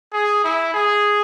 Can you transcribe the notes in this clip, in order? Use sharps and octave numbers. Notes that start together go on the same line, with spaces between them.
G#4
E4
G#4